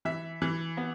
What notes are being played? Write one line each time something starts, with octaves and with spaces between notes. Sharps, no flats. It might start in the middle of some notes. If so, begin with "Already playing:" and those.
E3 E5
E3
B3